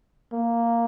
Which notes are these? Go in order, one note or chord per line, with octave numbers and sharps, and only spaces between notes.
A#3